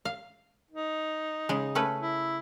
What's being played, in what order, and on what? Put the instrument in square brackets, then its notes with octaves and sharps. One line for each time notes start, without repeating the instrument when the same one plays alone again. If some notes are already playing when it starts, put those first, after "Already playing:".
[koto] F5
[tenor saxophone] D#4
[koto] C#3 G#3
A3 C#4 B4
[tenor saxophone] E4